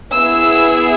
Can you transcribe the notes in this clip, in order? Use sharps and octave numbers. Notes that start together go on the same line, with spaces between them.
B3 E4 G#4 E6